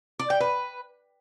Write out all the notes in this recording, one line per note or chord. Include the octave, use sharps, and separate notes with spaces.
D5
G5
B4